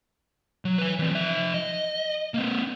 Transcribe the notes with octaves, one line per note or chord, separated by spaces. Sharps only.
F#3
B4 G#5
E3 C4
F3 E5
D#5
A#3 C4